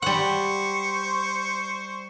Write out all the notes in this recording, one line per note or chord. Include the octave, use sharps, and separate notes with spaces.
G3 C5 F#5 C#6